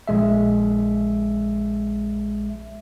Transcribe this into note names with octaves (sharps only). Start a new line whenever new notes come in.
A#1 G#3 E5